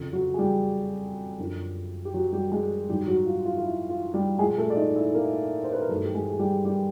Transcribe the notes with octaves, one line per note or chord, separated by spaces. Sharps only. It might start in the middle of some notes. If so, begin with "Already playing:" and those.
Already playing: F2 C#3 F3
F#3 F#4
G#4
G3 G4
F#2 D3 F3
G4
F#3 F#4
G3 G4
G#3 G#4
G#2 D#3 F#3 G3 G4
F#3 F#4
F4
F4
F4
E4
F4
G3 G4
A#2 F3 G#3 G#4
A3 A4
D5
D#4 D#5
E4 E5
A#3 A#4
C5
B4
A#4
G2 D#3 F#3 A3 A4
G4
G#3 G#4
G#4
G3 G4
G3 G4